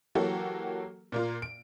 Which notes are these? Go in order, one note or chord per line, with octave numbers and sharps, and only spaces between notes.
E3 F#3 A#3 F#4 G4 A4
A#2 A#3 F4
D7